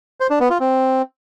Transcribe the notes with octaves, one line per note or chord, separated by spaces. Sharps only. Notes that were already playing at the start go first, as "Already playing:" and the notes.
C5
D4
B3
F4
C4